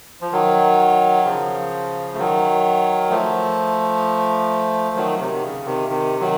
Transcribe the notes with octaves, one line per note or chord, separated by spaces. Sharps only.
F3
D#3 F#3
C#3 F3
A3
D#3 F#3
F3 A3
D#3 F#3
C3 D#3
C3
C#3
C3 D#3
C3 D#3
D#3 F#3